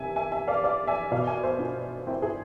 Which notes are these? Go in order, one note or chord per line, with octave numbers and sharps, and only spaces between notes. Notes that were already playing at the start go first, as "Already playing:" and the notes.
Already playing: C3 E5 G#5
E5 G#5
E5 G#5
D5 F5
D5 F5
E5 G#5
B2 D5 F5
E5 G#5
C5 E5
D4 F4
C4 E4
E4 G#4